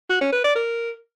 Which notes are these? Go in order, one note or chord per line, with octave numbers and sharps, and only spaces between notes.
F#4
C#4
B4
D5
A#4